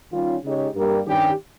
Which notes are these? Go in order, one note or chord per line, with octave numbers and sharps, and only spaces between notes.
D#3 G3 C#4 F4
C#3 G#3 D#4 G4 C#5
G2 G3 A#3
G2 D#3 G3 C#4 G4